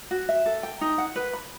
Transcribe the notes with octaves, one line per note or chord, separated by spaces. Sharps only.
F#4
E5
A4
G5
D#4
F#5
B4
B5